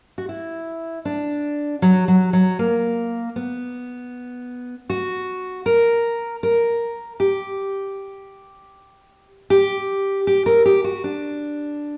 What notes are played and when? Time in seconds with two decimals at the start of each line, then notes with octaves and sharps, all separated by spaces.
0.18 F#4
0.29 E4
1.05 D4
1.82 F#3
2.08 F#3
2.33 F#3
2.59 A#3
3.36 B3
4.90 F#4
5.66 A#4
6.43 A#4
7.20 G4
9.50 G4
10.27 G4
10.46 A#4
10.65 G4
10.84 F#4
11.04 D4